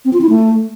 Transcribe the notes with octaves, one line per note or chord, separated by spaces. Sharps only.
C4
F4
E4
A3